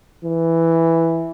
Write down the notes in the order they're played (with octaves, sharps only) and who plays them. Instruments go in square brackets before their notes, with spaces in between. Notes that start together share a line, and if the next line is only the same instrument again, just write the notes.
[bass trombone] E3